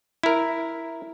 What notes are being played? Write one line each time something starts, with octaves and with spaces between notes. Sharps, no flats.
E4 A#4